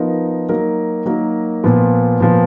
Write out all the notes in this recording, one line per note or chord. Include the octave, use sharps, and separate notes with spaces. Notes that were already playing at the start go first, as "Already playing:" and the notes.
Already playing: F3 B3 D#4 A#4
F#3 A#3 D#4 A#4
F#3 A#3 D#4 A#4
A#2 F3 B3
A#2 F3 B3